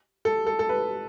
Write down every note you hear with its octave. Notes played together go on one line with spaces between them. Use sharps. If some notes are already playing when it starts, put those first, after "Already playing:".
A4
A4
A4
B4